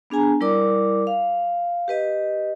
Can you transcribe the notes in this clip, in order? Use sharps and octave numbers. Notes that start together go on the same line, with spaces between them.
B3 D4 G#4 G#5 A#5
G3 E4 A#4 D5 D6
F5
G4 B4 D#5